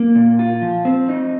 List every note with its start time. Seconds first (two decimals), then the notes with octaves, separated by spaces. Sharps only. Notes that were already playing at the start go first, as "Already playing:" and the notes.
Already playing: A#3
0.16 A#2
0.39 F4
0.62 F3
0.85 C4
1.09 D#4